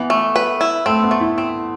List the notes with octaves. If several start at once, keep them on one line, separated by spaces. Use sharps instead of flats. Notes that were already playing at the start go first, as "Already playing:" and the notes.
Already playing: E3 B3
A3
B4
E4
A3 C4
B3
A3
E4
C4